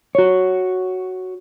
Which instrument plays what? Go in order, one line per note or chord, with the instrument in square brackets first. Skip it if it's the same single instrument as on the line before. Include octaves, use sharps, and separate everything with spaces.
[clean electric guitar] F#4 C#5